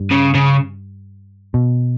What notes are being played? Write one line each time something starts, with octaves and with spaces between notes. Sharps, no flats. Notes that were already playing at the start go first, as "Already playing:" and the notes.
Already playing: G2
C#3
C#3
B2